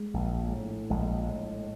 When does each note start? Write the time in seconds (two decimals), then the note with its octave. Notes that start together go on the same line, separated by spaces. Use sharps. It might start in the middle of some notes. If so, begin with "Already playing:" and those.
Already playing: G#3
0.14 A#1
0.52 A2
0.90 A#1 G#3
1.28 A2